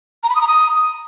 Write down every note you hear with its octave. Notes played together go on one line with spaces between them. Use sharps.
A#5
B5
D#6
A#5
D#6